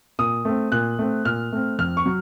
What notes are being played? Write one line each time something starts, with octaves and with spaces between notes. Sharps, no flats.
A#2 D#6
A3 C4
A#2 F#6
A3 C4
A#2 F6
A3 C4
F2 F6
C#6
F#3